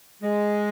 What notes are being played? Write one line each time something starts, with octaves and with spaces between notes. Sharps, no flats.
G#3